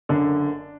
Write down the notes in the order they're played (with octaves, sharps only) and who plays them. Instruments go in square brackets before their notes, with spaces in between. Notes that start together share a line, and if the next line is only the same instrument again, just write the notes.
[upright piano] F#1 F#2 D3 D4